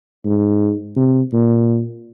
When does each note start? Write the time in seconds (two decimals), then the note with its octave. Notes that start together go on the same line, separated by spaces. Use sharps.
0.25 G#2
0.96 C3
1.33 A#2